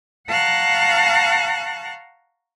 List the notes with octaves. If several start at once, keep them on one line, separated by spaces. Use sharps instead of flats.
F5 F#5 A5 A#5 C#6 F#6